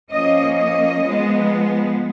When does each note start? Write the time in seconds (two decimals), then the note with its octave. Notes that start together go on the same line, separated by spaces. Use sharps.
0.11 F3 A#3 C#4 D#5
0.57 D#5
1.03 F3 G#3 B3